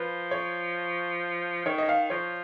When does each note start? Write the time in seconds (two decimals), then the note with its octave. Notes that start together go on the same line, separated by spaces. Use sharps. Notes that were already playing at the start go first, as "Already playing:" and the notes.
Already playing: F3 B4
0.31 C#5
1.66 D#3 C#5
1.78 D#5
1.89 F5
2.10 F3 C#5